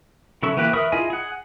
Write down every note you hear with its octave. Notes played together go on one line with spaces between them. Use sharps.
C#3 F#3 E4 A4 C#6
E3 A#3 F#4 G4 B4
A#4 B4 E5 C#6 D#6
E4 F4 G#4 D#5 G#5
G#4 F#5